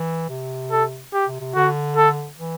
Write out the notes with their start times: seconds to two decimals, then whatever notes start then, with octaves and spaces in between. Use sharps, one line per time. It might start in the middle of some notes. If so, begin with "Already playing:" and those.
Already playing: E3
0.30 C3
0.72 A4
1.13 G4
1.28 C3
1.41 C3
1.55 D3 F#4
1.96 A4
2.39 E3